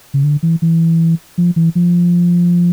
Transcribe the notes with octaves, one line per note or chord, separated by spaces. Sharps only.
C#3
D3
E3
E3
F3
E3
F3